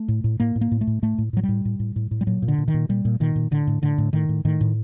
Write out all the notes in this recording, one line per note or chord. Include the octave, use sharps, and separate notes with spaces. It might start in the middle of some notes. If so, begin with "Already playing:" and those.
Already playing: A3
A2
A2
A2 A#3
A2
A#3
A2
A3
A2
A2 A3
A2
A2 F#3
G3
A2
A2
A2
A2
A2
G3
A#2 F#3
A#2
D3
A#2
D#3
A#2
A#2 G3
A#2
A#2 D#3
A#2
A2 D3
A2
A2 D3
A2
A2 D#3
A2
A2 D#3
A2